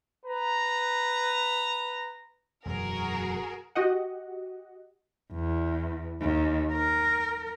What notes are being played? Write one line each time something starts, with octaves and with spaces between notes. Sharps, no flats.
B4 A#5
E1 F#2 F#3 F#4 G#4 A#4
F#4 G4 D#5 F#5
E2
D#2
A#4